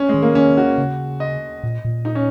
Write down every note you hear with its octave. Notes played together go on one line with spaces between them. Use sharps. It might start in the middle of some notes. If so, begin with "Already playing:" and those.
Already playing: C#4
G#3
D#3
A#3
C#4
F#4
C#3
D#5
A#2
A#2
D#4
C#4